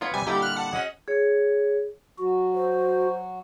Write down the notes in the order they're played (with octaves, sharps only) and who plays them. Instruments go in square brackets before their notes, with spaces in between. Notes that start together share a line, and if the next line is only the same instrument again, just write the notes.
[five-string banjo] A3 B3 C#5 [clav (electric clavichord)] F4
[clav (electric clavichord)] C3 G3 [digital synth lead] G#5
[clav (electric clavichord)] A#2 D3 G3 [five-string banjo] D#4 E4 [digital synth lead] G4
[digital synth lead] F6 [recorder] F#6
[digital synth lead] F#5 [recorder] A5
[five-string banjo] C#4 F#4 G#4 [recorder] D#5
[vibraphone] G#4 C#5
[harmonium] F#3 [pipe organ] F#4
[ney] C5